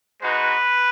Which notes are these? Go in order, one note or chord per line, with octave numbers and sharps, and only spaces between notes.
G#3 D#4 F#4 B4